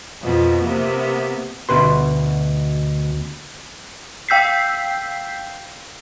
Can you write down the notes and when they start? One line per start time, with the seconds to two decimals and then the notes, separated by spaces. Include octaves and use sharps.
0.23 F2 B2 F3
0.62 C3 A#3 B3
1.69 D2 B2 B4 C6
4.29 F5 G5 E6 G6 B6 C7